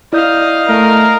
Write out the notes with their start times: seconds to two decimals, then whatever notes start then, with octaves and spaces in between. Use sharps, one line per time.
0.13 E4 D5 D#5 F5 G6
0.69 A3 A#4